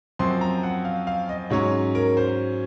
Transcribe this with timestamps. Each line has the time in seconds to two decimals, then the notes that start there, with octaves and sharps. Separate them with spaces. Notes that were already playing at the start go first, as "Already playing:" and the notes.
0.19 F#2 F3 C4 C6
0.41 A#5
0.63 F#5
0.85 F5
1.07 F5
1.29 D#5
1.50 G#2 F#3 C#4 C#5
1.95 A#4
2.17 C5